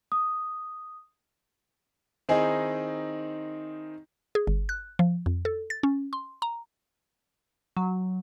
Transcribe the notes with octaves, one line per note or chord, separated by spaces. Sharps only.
D#6
D#3 C4 D#4 E4 G#4 D#5
G#4
G1
F#6
F3
F2
A4
A6
C#4
C6
A#5
F#3